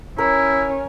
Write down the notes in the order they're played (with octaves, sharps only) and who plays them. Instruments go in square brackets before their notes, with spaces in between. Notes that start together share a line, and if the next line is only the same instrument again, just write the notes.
[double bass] C#4 [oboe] E4 [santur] A#4